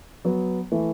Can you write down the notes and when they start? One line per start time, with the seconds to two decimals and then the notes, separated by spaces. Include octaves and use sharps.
0.25 F#3 B3
0.71 E3 A3